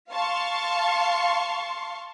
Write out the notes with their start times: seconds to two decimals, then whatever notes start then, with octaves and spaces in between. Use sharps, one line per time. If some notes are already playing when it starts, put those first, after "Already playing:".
0.10 F5 A5 C6 C#6